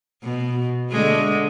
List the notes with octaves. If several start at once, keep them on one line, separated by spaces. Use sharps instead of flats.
B2
D3 G#3 A3